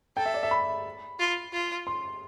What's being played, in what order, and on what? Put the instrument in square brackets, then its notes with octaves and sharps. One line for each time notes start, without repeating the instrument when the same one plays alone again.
[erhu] A4 [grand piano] G5
[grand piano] E5
D5
E5
B5
[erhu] F4
F4
[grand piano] C6